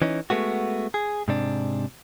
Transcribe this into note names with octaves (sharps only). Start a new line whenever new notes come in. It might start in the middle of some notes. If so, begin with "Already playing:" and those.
E3 C#4 D#4
G#3 A3 B3 F#4
G#4
G#2 C3 D4